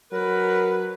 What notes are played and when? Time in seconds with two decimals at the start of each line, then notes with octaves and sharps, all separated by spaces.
0.12 F#3 A#4 B4